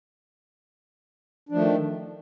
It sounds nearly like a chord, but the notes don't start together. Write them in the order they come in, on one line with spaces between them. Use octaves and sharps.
D4 F3 A3 D#3